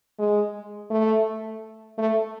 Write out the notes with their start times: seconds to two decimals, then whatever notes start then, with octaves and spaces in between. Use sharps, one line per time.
0.19 G#3
0.90 A3
1.98 A3